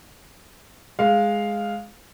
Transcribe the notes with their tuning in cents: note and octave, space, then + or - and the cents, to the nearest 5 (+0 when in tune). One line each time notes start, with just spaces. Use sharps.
G#3 +0 F5 +0